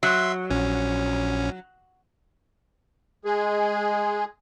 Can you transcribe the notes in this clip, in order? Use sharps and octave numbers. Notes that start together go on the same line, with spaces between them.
F#3 E5 C6
A#1 C#4
G#3 G#4